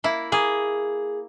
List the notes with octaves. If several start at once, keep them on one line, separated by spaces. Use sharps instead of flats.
A#3 E4
A#3 G#4